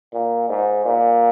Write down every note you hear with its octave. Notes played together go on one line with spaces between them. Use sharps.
A#2
G#2
A#2